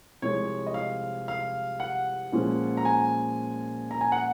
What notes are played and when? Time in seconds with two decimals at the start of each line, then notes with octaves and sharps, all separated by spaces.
0.22 C2 C3 F3 G#3 C#5
0.67 D#5
0.74 F5
1.28 F5
1.80 F#5
2.32 A#2 F3 G#3 C#4
2.77 A#5
2.85 G#5
3.91 A#5
4.01 G#5
4.12 F#5